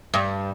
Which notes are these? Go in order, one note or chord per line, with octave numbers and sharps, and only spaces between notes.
G2